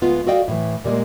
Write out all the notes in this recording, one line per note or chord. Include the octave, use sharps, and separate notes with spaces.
D2 G#3 B3 F4
F#4 A4 D5 D#5 F5 G5
A2 E3
A#2 G3 G#3 A#3